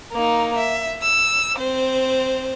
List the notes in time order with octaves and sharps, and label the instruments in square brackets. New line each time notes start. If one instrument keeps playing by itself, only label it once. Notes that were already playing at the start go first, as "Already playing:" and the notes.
[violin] A#3 D#4
E5
E6
C4 C5